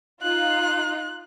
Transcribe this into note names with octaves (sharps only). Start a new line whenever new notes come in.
D#4 F4 F#6